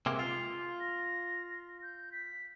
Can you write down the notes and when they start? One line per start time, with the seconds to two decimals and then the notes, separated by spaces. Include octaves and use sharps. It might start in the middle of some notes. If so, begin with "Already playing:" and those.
0.06 C3 G#3 A#3
0.19 F4
0.80 A#6
1.83 G6
2.12 B6